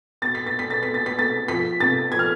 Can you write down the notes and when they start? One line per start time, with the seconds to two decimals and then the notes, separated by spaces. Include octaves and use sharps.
0.22 B2 A6
0.35 B6
0.46 A6
0.54 B2
0.59 B6
0.70 A6
0.83 B2 B6
0.94 A6
1.06 B6
1.17 B2 A6
1.48 F3 B6
1.80 C3 A6
2.12 F3 G#6
2.19 F6